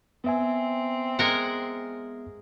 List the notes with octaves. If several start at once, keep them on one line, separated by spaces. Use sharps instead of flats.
B3 C4 E5 G#5
G#3 A#4 F#5